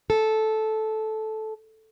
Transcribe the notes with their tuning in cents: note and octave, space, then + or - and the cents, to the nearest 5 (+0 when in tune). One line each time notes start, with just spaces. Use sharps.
A4 -10